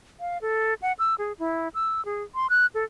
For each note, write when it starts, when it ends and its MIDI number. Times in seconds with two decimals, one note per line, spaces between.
0.20 0.38 77
0.42 0.74 69
0.82 0.93 78
0.99 1.15 88
1.18 1.33 68
1.39 1.68 64
1.74 2.04 88
2.05 2.23 68
2.35 2.47 84
2.50 2.66 90
2.74 2.84 69